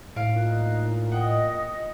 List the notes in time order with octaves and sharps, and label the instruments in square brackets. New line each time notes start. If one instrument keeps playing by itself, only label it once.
[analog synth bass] A2 [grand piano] F5 D7
[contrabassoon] A#2 [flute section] D#4 F#6
[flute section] D#5 D#6 [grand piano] F#5 G5